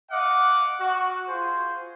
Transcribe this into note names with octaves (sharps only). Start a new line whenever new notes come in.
D#5 F5 F#5 D6
F#4
F4 G#4 C5